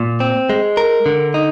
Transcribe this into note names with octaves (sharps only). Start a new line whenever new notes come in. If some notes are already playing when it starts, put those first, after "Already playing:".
Already playing: A#2
C4
G#3
A#4
D3
D#4